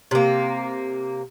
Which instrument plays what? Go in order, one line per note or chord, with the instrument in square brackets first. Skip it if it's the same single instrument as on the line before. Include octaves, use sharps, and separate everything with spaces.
[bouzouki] C3 A#3